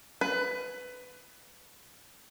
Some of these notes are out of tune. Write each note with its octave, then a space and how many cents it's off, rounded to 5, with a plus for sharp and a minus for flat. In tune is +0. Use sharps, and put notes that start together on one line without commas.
B4 +20